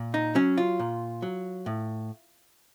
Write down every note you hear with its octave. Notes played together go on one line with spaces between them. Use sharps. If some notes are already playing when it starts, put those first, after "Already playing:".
Already playing: A#2
D#4
F#3 C#4
F4
A#2
F#3
A2